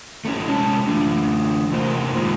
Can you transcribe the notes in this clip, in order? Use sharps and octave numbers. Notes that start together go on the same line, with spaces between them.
A3 B3 C#4 E4
C3 G#3 C#4 C#5 A5
E3 A3 D4
E2 C3 A#3 C5
A#2 D#3 G#3